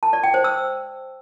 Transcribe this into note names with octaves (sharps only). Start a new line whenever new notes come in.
A5
D5
G5
C5
E6